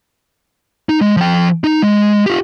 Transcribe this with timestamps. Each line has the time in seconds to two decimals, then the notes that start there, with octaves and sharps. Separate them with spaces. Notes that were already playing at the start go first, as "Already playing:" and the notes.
0.89 D#4
1.01 G#3
1.17 F3 G5
1.64 D#4
1.82 G#3
2.26 F4 G4